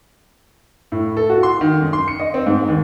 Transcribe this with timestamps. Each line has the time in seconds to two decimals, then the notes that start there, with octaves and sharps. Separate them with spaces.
0.92 A2
1.17 A4
1.30 F#4
1.43 C6
1.61 D#3
1.82 F#2
1.93 C6
2.08 C#7
2.20 D#5
2.34 C4
2.47 G#2
2.68 D#2